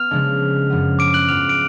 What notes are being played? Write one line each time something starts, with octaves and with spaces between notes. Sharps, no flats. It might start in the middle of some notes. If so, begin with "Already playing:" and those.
Already playing: B3 F6 F7
C#3 F3 G#3 D4
F#2 F3 B3
D6 D7
F#6 F#7
G#2 F3 B3 F4 F6 F7
D7